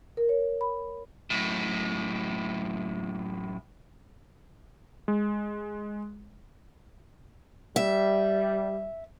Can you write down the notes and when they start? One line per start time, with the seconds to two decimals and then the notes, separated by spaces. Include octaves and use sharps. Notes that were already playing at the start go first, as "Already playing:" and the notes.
0.17 A#4
0.29 C#5
0.61 B5
1.30 F#2 A2
5.08 G#3
7.76 G3 E5